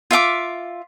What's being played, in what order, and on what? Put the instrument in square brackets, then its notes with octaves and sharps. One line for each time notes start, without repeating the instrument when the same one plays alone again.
[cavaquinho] F4 E5 F5 D6